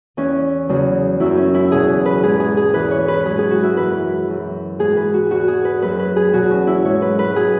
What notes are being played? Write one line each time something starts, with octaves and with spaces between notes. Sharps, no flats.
E2 E3 C#4
E2 C#3 F#3
F#2 F#3 E4
C#4
E4
E2 B2 F#3 G#4
B4
G#2 E3 G#4
G#4
G#4
E2 E3 B4
C#5
B4
G#2 F#3 G#4
G#4
F#4
E4
F#2 E3 B4
F#2 E3
G#2 E3 G#4
B4
F#4
E2 E3 F#4
G#4
B4
F#2 F#3 B4
B4
G#4
E2 B2 F#3 F#4
C#4
E4
G#2 F#3 C#5
B4
B4
F#3 G#4